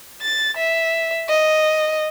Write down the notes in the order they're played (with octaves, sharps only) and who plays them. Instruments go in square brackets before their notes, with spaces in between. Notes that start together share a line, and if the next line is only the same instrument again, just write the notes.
[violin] A6
E5
D#5